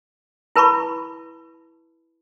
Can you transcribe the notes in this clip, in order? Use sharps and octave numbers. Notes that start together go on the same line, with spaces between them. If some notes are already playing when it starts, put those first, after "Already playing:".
E4 B4 A5 B5 C#6